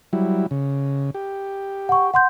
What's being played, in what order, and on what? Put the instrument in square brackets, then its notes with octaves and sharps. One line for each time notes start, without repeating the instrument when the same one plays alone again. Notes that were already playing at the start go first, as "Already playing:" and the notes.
[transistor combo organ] F#3 G3 E4
C#3
G4
[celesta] F#5 C#6
F#5 C6 G6